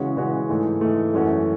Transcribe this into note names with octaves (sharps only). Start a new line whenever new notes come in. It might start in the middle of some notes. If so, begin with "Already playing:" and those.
Already playing: C#3 E3 G#3 C#4 F#4
C#3 E3 G#3 C#4 F#4
G#2 E3 A3
G#2 E3 A3
F#2 E3 A3 C#4 F#4